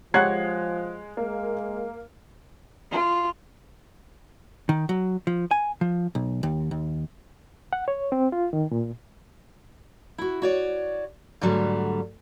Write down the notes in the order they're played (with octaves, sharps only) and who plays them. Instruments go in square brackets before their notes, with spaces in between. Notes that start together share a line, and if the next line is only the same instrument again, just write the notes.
[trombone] F3 [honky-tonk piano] G#3 [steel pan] G4 C#5 F#5 [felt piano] F#6 G#6 C7
[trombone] G#3 [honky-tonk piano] A#3
[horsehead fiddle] F4
[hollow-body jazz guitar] D#3
F#3
F3
G#5
F3
B1
D#2
D#2
[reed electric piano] F#5
C#5
C4
F4
D#3
A#2
[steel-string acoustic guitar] E4 F#4
F#4 C#5 D5
G#2 D3 F#3 G3 A3